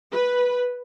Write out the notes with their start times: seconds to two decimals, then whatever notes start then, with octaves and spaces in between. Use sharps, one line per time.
0.13 B4